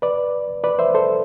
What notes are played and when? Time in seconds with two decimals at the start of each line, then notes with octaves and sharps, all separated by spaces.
0.02 B4 D5
0.64 B4 D5
0.79 C5 E5
0.95 A4 C5